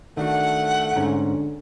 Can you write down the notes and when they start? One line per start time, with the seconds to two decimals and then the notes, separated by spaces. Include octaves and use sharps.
0.17 D#3 A3 D4 F#4 F#5
0.96 G#2 D3 C#4 A#5